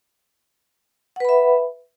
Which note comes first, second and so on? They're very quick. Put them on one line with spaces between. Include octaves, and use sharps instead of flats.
F#5 B4 B5 E5